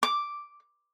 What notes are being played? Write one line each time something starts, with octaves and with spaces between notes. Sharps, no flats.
D6